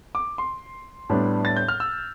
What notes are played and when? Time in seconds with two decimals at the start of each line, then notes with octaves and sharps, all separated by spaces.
0.15 D6
0.38 C6
1.10 A2 G3 B3 D4
1.45 A6
1.57 G6
1.68 F6
1.80 E6